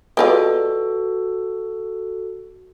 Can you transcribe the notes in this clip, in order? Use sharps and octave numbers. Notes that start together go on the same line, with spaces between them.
G#3 F4 F#4 A4 B4 D5